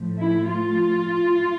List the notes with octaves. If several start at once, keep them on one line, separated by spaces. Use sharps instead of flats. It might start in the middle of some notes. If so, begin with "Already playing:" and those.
Already playing: A2 F3 A3
E4
F4